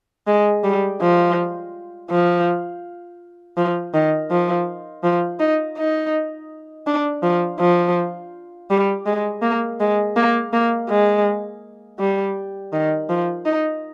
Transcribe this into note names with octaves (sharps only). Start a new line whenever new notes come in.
G#3
G3
F3
F3
F3
D#3
F3
F3
D#4
D#4
D4
F3
F3
G3
G#3
A#3
G#3
A#3
A#3
G#3
G3
D#3
F3
D#4